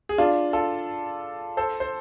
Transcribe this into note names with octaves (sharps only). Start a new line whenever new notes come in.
G#4
D4 F4
F4 A4
A4 C5
C5